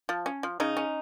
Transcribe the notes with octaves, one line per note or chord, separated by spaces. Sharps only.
F3
C#4
F3
C#3 D#4
C#4